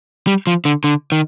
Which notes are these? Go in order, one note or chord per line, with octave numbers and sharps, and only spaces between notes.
G3
F3
D3
D3
D#3